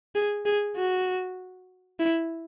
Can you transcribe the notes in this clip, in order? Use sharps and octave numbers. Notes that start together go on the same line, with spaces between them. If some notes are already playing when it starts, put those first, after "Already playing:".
G#4
G#4
F#4
E4